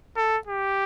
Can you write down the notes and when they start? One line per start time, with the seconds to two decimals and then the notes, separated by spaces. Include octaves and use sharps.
0.16 A4
0.47 G4